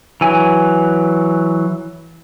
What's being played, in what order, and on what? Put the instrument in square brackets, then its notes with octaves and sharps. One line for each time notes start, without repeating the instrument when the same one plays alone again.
[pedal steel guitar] E3 F#3 G#5